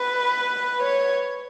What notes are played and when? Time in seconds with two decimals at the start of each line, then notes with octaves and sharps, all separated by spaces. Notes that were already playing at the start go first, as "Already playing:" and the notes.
Already playing: B4
0.83 C#5